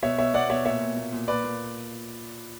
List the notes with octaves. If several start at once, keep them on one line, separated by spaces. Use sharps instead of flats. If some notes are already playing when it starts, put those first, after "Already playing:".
B2 C#5 E5
B2 C#5 E5
B2 D5 F#5
B2 C#5 E5
A#2 C#5 E5
A#2
A#2
A#2
A#2 B4 D5
A#2